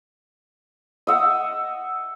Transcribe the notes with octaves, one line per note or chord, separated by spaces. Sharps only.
D#5 E5 F#5